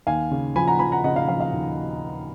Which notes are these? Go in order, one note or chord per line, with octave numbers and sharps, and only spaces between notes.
D#2 F5 G#5
C#3
F3 G#5 B5
F#5 A#5
F3 G#5 B5
F#5 A#5
C#3 D#5 F#5
F5
F3 F5
F5
D#2